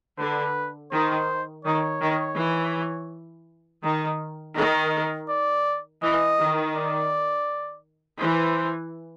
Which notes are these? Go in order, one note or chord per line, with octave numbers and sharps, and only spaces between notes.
D3 B4
D#3 C5
D#3 C#5
D#3
E3
D#3
D#3
D5
E3 D#5
D#3
D5
E3 C5